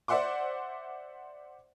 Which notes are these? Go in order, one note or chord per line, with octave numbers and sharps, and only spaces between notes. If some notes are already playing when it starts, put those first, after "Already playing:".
C5 D5 E5 F#5 C6 D6